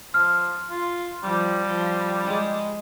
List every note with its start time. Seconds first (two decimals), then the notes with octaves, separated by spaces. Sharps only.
0.14 F3 F6
0.70 F4
1.24 F3 G3
1.67 F3
2.25 G#3